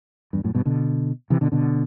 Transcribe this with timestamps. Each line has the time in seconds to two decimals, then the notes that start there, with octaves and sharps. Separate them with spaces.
0.33 E2 G2
0.44 F#2 A2
0.55 G2 B2
0.65 B2 D3
1.30 C3 E3
1.41 B2 D3
1.52 B2 D3